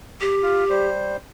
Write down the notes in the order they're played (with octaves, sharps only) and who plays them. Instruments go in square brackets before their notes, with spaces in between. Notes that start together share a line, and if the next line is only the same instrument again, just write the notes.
[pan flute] G4
[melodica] F4
G3 C5